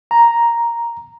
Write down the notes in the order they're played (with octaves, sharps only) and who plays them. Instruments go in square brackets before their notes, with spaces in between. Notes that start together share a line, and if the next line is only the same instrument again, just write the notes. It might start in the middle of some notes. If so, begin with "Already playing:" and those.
[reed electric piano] A#5